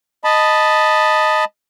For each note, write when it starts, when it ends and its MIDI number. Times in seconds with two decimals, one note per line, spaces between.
0.24 1.45 75
0.24 1.45 81
0.24 1.45 83